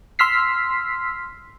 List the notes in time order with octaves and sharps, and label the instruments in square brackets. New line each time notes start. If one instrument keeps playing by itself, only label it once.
[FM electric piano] C6 E6 F6 B6 C7